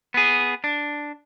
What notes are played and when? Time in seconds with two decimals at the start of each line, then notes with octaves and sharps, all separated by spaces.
0.14 B3 G#4
0.64 D4